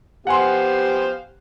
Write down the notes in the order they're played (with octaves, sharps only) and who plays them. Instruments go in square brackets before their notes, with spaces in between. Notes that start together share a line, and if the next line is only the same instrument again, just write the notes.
[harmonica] B3 C5 F5 [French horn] G4 [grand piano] F#5 G#5 C6